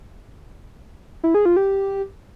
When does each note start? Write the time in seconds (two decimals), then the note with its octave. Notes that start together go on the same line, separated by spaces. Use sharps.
1.24 E4
1.34 G#4
1.45 F4
1.56 G4